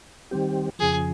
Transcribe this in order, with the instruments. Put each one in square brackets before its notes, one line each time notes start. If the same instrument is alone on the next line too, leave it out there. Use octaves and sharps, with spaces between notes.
[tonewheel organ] D#3 G3 C4 G4
[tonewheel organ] F2 C#3 F3 [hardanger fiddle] G#4